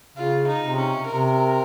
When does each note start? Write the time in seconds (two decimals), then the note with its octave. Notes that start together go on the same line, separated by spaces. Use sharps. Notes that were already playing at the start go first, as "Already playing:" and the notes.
0.17 C#3 F4
0.47 D#4
0.63 C3
0.77 C#4
1.06 C3 A#4